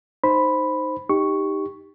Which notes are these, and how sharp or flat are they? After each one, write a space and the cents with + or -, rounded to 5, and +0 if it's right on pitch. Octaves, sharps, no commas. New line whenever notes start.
D#4 +0 C5 +0 B5 +0
D#4 +0 G4 +10 C#6 +0